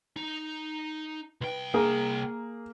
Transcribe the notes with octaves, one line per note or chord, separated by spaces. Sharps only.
D#4
C2 B4 G5
A#3 G#4 A#5